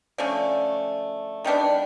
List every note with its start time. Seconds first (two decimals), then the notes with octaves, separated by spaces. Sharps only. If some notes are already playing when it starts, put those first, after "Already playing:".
0.18 D3 F3 A3 C#4
1.44 D#3 G3 B3 D4